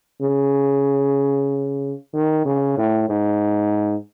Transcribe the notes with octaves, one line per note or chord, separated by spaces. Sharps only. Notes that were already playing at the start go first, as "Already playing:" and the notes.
C#3
D#3
C#3
A2
G#2